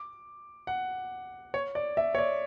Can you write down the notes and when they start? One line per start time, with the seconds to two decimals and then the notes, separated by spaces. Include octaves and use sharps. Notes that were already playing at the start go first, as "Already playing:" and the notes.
Already playing: D6
0.67 F#5
1.54 C#5
1.75 D5
1.97 E5
2.15 C#5
2.18 D5